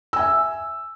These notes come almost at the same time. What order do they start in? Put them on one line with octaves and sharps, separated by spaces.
E6 G#5 E5